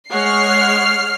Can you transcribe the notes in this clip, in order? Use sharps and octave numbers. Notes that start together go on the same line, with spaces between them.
G#3 C#5 F#5 F6 C7